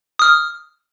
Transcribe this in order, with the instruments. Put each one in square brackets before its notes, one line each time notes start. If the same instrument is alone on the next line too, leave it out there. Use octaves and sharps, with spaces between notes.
[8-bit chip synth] D#6 F6